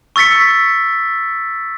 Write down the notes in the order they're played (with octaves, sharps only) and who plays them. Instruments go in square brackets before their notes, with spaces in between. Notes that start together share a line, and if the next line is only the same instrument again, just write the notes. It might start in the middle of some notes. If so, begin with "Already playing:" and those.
[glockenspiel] C#6 E6 A6 B6 C#7